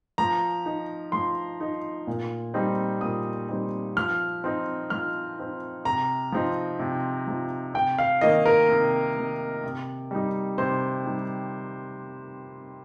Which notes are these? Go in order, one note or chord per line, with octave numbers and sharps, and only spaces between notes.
F3 A#5
D#4
F3 C6
D#4
A#2
G3 C4 D#4
A#2 D#6
G3 C4 D#4
F3 F6
C4 D#4
F3 F6
C4 D#4
C3 A#5
F3 C4 D#4
C3
F3 C4 D#4
C3 G5
F5
D#3 A#3 D#5
A#4
C3
D#3 A#3
C3
G3 D#4
C3 C5
G3 D#4